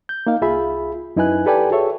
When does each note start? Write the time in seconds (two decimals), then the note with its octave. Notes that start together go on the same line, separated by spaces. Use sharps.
0.09 G6
0.27 A#3 D#4 F5
0.41 C2 F4 G#4 E5 B5
1.16 F#2 D#4 E4 B4 G#5 F#6
1.46 G4 A4 B4 D5 G5 G#5
1.71 F#4 G#4 A4 C#5 E5